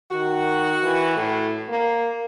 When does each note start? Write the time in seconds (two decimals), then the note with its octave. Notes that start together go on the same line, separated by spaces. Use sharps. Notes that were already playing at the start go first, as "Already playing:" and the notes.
0.11 D#3 F#4
0.83 E3
1.17 A2
1.69 A#3